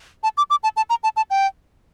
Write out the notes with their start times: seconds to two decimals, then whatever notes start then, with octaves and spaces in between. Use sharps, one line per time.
0.23 A5
0.38 D6
0.50 D6
0.63 A5
0.77 A5
0.90 A#5
1.04 A5
1.17 A5
1.30 G5